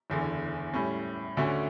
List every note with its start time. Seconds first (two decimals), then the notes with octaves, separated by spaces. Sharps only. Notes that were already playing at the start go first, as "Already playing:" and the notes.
0.10 F#1 E2 D3
0.74 A2 G3 C#4
1.37 D2 D3 A3 C#4 F#4